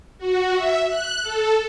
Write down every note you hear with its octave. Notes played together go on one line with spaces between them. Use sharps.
F#4
E5
F#6
A4